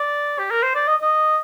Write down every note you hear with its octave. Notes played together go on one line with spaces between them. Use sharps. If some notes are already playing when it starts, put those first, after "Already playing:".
Already playing: D5
G4
A#4
C5
D5
D#5
D#5